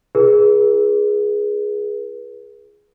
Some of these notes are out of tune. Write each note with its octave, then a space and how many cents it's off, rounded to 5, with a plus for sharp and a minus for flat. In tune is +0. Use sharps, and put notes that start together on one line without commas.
F4 -40 G#4 +0 B4 -40